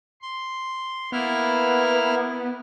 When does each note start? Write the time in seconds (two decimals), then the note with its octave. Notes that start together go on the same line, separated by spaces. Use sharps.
0.22 C6
1.12 A#3 B3 E4 F6